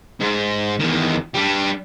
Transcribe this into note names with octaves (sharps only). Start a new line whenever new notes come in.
G#2
E2 D#3
G3 D4